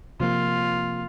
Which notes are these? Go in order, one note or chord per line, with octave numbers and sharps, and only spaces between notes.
C3 F3 A#3 F4